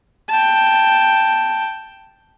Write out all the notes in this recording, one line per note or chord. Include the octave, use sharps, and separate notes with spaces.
G5 A5